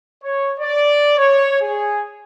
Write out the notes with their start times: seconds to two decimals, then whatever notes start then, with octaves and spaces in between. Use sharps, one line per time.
0.23 C#5
0.60 D5
1.17 C#5
1.61 G#4